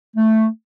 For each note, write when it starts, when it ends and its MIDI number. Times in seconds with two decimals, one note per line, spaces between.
0.16 0.46 57